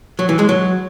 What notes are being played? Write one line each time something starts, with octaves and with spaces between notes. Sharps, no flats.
F#3
E3
G#3
F#3